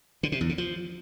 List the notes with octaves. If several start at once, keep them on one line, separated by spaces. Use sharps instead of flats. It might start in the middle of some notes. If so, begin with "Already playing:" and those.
D3
C3
E2
C#3
F3